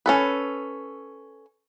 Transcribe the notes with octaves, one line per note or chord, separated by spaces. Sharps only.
C#4 A4 B4